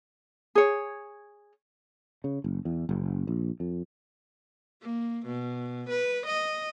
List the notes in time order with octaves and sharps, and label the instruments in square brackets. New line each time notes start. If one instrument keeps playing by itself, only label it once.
[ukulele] G#4 C#5
[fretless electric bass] C#3
F#1
E2
F#1
A#1
F2
[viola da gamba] A#3
B2
B4
D#5